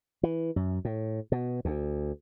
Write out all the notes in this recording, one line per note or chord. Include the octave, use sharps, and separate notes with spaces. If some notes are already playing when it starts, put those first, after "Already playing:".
E3
F#2
A2
B2
D2